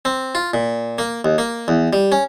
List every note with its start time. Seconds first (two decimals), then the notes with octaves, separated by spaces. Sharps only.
0.05 C4
0.35 F4
0.54 A#2
0.98 A#3
1.25 D#2
1.38 A#3
1.68 E2
1.93 G3
2.12 C#4